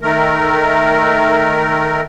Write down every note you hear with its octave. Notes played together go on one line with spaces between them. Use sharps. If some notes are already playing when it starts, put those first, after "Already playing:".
D#3 A3 A#4